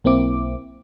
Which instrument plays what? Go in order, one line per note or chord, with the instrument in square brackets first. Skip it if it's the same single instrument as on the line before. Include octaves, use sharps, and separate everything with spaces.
[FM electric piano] B1 A#3 C4 E4 D6